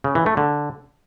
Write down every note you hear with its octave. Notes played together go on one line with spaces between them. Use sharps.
C#3
E3
A3
D3